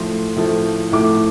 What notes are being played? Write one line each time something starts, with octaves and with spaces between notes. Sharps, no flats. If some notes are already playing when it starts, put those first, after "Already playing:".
Already playing: A2 F3 A3 C6
A2 F3 A3
A2 F3 A3 D6